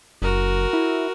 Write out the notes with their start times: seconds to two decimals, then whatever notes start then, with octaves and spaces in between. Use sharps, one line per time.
0.22 F#1 F#4 A#4
0.73 E4